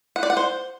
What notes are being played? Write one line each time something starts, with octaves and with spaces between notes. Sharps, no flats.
F#5
D5
F#5
C5